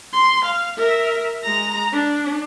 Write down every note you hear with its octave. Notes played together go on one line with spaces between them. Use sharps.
C6
F5
A#4 E5
G#3 A#5
D4